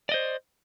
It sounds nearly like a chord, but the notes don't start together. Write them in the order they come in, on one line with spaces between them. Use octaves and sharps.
D5 D#5 C5